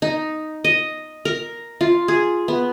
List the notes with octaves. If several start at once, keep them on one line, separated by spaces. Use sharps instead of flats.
D#4
D#5
A#4
F4
G#4
B3